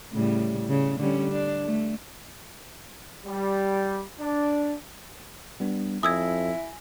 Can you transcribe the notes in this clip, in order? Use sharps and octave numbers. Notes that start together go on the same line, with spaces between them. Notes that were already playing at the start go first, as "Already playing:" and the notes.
A2 C#3 G3
C#3
D3 G3 C#4
D4
A3
G3
D4
G3 B3 D4
F2 E4 G#5 D#6 E6 G#6 A#6